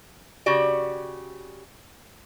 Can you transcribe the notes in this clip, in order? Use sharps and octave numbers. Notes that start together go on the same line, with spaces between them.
C#3 F#4 G4 D5